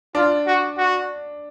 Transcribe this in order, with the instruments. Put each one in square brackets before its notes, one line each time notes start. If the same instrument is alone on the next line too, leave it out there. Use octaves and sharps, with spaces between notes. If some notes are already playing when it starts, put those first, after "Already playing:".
[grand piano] D4 [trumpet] F4
[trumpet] F#4
F#4